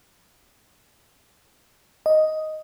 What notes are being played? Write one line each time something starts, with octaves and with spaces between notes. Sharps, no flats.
D#5